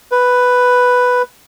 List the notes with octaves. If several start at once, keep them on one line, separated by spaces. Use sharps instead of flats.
B4